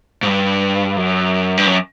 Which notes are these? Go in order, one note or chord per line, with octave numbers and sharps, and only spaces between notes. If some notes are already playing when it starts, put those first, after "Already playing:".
G#2
G2
F#2
G2
F#2